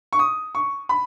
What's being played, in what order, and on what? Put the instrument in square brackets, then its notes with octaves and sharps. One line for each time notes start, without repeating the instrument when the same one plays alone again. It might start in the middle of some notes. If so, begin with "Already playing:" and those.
[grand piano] C#6
D#6
C#6
B5